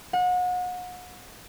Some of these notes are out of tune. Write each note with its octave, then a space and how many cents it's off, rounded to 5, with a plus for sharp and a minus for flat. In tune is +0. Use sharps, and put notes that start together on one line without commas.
F#5 -35